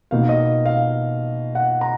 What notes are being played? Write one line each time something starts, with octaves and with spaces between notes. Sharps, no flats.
B2 A#3 D#4 F5
D#5
F5
F#5
A#5